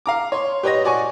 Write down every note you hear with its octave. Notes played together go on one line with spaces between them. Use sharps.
F5 A#5 D6
C#5 C6
G4 B4 C#5 D#5 A#6
F#4 D5 G#5 C#6